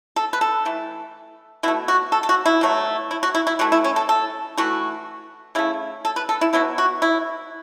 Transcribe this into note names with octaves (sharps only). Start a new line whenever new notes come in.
A4
B4
A4
E3 A3
B2 A3 E4
F#4
A4
A4
F#4
E4
B2 F#3 A3
E4
F#4
E4
E4
E3 A3 F#4
E4
C#4
A4
A4
E3 A3 F#4
C#3 A3 E4
A4
B4
A4
E4
B2 F#3 B3 E4
F#4
E4